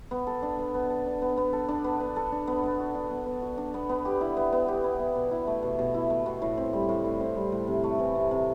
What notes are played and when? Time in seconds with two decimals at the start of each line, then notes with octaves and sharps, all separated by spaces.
0.11 B3
0.27 A4
0.42 D4
0.59 B3
0.74 B3
0.90 A4
1.06 D4
1.22 B3
1.37 B3
1.53 A4
1.69 D4
1.84 B3
2.00 B3
2.16 A4
2.32 D4
2.47 B3
2.63 B3
2.79 F#4
2.95 D4
3.11 B3
3.26 B3
3.42 F#4
3.58 D4
3.74 B3
3.89 B3
4.05 G4
4.21 E4
4.37 B3
4.52 B3
4.68 G4
4.84 E4
4.99 B3
5.15 B2
5.31 E4
5.47 A3
5.63 B2
5.79 B2
5.94 E4
6.10 A3
6.26 B2
6.42 A2
6.58 C4
6.73 G3
6.89 A2
7.04 A2
7.20 C4
7.36 G3
7.52 A2
7.68 C3
7.84 A3
7.99 E3
8.15 C3
8.31 C3